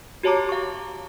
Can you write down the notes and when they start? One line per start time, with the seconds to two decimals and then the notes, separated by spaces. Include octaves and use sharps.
0.23 F#4 G4 C#5 A5 A#5 D6
0.49 F5 C#6